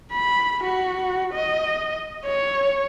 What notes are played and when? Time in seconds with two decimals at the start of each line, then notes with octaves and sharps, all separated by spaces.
0.12 B5
0.63 F#4
1.34 D#5
2.25 C#5